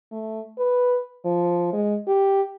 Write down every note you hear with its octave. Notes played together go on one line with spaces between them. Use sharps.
A3
B4
F3
G#3
G4